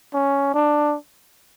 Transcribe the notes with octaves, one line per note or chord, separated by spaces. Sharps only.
C#4
D4